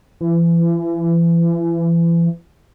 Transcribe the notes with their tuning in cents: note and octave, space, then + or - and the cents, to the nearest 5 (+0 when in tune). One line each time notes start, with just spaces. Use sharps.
E3 +35